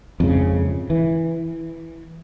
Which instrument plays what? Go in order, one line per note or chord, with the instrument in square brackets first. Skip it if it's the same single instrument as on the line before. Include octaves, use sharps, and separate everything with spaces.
[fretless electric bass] F2 G#2 C#3
E3